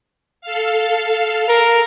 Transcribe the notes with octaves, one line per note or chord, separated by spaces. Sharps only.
A4 F5
A#4